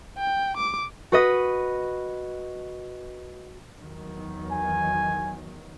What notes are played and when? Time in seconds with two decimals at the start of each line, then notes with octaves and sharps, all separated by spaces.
0.19 G5
0.57 D6
1.12 F#4 B4 D#5
3.81 E2 D#3 F#3
4.51 G#5